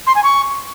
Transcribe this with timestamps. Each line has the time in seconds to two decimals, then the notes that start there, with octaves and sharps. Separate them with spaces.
0.07 C6
0.15 G#5
0.24 C#6